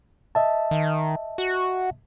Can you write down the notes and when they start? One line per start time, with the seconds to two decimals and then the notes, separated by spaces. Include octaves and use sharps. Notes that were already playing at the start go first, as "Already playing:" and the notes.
0.35 D#5 E5 A5
0.71 D#3
1.38 F#4